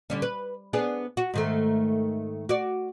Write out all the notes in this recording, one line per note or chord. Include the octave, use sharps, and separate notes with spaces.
D3 G3 C#4
B4
B3 D4 G#4
F#4
G#2 D#3 A3
F#4 D5